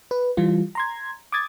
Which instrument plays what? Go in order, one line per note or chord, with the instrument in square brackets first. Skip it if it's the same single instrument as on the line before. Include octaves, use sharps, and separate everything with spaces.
[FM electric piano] B4
E3 G3 F4
A#5 C6 G#6
D6 D#6 G#6 A6